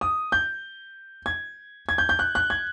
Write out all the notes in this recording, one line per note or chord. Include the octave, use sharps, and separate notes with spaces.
D#6
G6
G#6
G#6
G6
G6
F#6
F#6
G#6